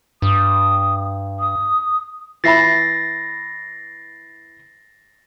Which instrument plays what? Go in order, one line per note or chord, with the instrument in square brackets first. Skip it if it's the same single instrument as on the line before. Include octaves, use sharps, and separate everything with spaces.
[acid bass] G2 [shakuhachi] D#6
[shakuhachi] D#6
[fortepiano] E3 E5 B5 [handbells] A6 A#6 C7